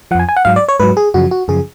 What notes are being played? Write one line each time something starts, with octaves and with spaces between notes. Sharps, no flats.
F2 F3 F#5 G#5
G#5
F#5
G#2 F#3 F5
D5
C#5
G#2 F#3 B4
G#4
F#2 C#3 F3 F#4
F#4
F#2 C#3 F3 G#4